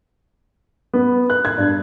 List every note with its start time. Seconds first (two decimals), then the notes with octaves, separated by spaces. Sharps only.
0.94 B3
1.30 F#6
1.45 G#6
1.58 G2